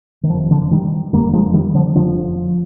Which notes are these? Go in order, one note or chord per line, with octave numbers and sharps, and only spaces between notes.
D#3
F1 F2 D3 F3
D3 F3
D#3 G3
F1 F2 D3 G3 A#3
F3 G#3
D#3 G3
D3 F3
F1 F2 D3 F3